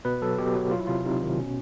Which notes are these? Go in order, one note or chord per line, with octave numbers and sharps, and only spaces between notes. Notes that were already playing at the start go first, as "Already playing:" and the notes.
B2 B4
F#3 A4
B2 G4
F#3 F#4
F#3 F4
E4
C3 F4
C3 D#4
D#3
B2 C#4